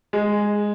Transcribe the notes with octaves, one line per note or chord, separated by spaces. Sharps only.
G#3